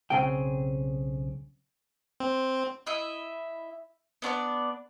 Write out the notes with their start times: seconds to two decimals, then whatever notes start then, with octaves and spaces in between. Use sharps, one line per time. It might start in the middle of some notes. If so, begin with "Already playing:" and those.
0.10 B1 C#3 C4 G#4 G5
2.20 C4
2.86 E4 D#5 E5
4.22 B3 D4 C#5 D5